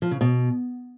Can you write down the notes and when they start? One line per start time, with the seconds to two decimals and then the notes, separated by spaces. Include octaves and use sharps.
0.02 F3
0.11 C#3
0.21 B2